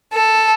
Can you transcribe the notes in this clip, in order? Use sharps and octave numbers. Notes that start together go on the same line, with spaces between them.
A4